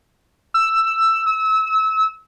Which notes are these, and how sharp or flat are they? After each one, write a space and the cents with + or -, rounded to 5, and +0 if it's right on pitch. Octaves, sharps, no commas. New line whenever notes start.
E6 +10
E6 -30